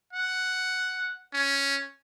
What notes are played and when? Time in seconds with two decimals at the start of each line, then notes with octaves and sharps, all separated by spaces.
0.13 F#5
1.34 C#4